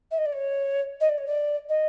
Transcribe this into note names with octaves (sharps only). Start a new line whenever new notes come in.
E5
D#5
D5
C#5
D#5
D5
C#5
D5
D#5